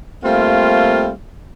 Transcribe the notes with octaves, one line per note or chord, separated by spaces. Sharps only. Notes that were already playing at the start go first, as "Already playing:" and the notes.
G3 A3 A#3 C4 F4 F5